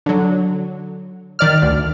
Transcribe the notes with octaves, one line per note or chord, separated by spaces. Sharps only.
D3 F#3
D#3 D5 F6
D2